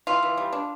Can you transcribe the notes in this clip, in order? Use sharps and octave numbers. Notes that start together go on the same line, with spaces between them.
E3 F4
E3
G3
D4